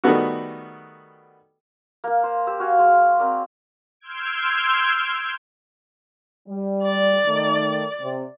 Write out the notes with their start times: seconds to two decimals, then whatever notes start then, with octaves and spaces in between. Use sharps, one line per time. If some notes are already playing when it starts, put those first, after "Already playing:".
0.04 D#3 G3 A3 B3 F#4
2.04 A#3 A#4
2.24 C5
2.47 G4 E6
2.60 F#4 F5 G#5
2.79 G#3
3.20 C4 A#4 D5
4.00 C6 E6 F6 G6 G#6 D7
6.48 G3
6.83 D5
7.26 D#3 A3
8.01 C3